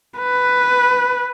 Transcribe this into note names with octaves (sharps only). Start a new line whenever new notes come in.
B4